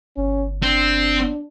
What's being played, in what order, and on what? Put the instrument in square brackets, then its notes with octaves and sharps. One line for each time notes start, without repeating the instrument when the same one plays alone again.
[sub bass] G1 [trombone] C#4
[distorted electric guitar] C4 [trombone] D4